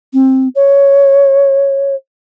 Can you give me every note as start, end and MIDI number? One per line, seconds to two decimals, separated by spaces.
0.13 0.48 60
0.55 1.95 73